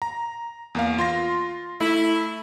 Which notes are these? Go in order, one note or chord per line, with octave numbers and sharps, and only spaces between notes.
A#5
E2 A#3 F5
F4 C6 A#6
A3 E4